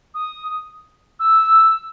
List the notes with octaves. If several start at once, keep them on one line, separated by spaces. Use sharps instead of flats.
D#6
E6